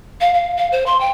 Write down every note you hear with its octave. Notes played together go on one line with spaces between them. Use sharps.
F5
F5
F5
C5
C6
G5